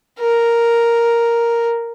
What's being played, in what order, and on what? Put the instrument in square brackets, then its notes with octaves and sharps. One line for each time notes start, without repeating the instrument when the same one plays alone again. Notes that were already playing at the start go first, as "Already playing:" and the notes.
[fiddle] A#4